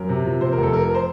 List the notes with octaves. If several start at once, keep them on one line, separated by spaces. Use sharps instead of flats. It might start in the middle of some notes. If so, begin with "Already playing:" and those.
Already playing: F#2 A#4
C3
F3
C3 C5
A#4
F1
A4
F3 A#4
A#4
C5